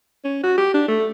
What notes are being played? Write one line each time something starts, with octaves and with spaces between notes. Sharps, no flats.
C#4
F#4
G4
D4
A3